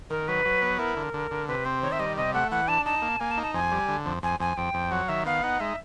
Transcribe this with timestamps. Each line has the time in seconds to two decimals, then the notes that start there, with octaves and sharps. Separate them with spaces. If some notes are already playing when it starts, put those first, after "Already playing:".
0.10 D#3 A#4
0.28 F#3 B4
0.45 F#3
0.62 B3
0.79 E4 A#4
0.97 D3
1.13 D3
1.31 D3
1.48 C3 B4
1.65 C4 C5
1.82 D#3 C#5
1.92 E5
1.99 G3 D#5
2.17 C3 D#5
2.34 A3 F#5
2.51 E3 F#5
2.68 D4 A5
2.86 D#4 A5
3.02 A#3
3.20 A#3 G#5
3.31 A5
3.38 D#4
3.43 A5
3.54 F2 G#5
3.72 G3
3.88 D3
4.06 F2
4.23 F2 G#5
4.40 F2 G#5
4.57 F2 G5
4.74 F2
4.91 F#3 F#5
5.09 D#3 E5
5.26 B3 F5
5.43 D#4 F#5
5.60 G#3 E5